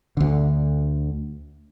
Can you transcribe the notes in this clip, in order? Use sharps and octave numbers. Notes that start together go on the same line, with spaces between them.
D2 D3